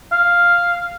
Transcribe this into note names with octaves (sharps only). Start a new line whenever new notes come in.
F5